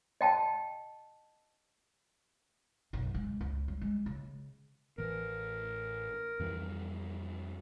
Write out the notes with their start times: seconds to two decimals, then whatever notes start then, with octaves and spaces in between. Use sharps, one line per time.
0.21 D#5 G5 A5
2.93 B1 F#2
3.14 C#2 G#3
3.41 C#2
3.68 G3
3.81 G#3
4.06 C#3
4.98 A1 E3 A#4
6.40 F2 E3 G3